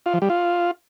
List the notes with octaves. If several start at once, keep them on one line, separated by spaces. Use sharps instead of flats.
F4
F3
G3
F4